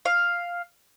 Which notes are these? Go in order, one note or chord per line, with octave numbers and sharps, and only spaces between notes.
F5